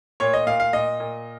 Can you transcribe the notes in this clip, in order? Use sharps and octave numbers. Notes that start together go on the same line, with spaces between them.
A#2 C#5
D#5
A#2 F5
F5
A#2 D#5
A#2